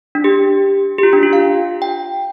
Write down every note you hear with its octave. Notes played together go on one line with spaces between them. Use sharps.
D4
G4
G4
F4
D4
F4
F5
G5